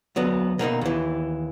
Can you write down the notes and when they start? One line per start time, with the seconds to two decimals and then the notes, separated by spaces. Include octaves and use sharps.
0.16 D2 F#3 B3
0.59 B2 A#3 C4 D#4
0.81 D#2 E3